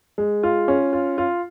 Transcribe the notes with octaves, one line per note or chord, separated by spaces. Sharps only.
G#3
F4
C#4
F4
F4